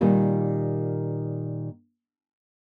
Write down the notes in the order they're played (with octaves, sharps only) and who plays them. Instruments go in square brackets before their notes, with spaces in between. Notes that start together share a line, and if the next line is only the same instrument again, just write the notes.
[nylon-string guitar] A#2 D#3 G3 A#3 F4